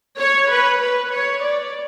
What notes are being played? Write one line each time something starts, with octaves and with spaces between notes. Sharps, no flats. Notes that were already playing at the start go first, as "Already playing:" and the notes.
C#5
B4
B4
C#5
D5